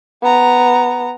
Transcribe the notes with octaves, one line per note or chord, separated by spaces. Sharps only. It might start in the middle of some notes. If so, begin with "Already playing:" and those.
B3 A#5